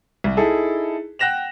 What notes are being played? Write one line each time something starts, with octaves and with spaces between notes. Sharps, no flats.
C2
D#4 E4 G#4 A4
F#5 G5 F#6 A#6 E7 F7